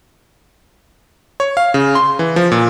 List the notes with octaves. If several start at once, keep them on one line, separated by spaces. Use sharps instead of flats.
C#5
F5
C#3
C6
E3
F3
A#2